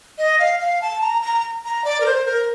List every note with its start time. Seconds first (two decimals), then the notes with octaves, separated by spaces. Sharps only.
0.18 D#5
0.39 F5
0.60 F5
0.82 A5
1.01 A#5
1.22 A#5
1.65 A#5
1.84 D5
2.00 A#4
2.06 C5
2.26 A#4